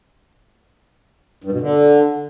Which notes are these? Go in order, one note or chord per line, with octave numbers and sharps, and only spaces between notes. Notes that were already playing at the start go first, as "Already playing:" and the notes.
G2
B2
D3